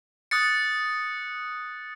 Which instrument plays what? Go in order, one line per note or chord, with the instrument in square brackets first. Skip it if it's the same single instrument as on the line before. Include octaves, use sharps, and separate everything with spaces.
[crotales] D#6 F#6 A6 C#7